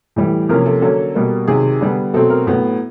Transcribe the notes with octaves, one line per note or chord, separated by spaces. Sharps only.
A2 E3 G3
C3 F3 A#3 C#4 A#4
A4
D3 F#3 A#3 C#4 A4
B2 G3 A#3
C3 D#3 F#3 G#4
D3 G3 B3
B2 F#3 A3 C4 A4
A#4
A2 F#3 B3